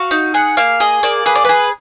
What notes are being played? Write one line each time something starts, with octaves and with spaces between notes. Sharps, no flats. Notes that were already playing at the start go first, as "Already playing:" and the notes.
Already playing: F#4 F5
D#4
G#4 F#5
A#3 F5
G#4 D#5
A#3 D5
G#4 B4
D5
G#4 B4